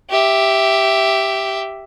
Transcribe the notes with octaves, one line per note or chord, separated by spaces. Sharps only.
G4 E5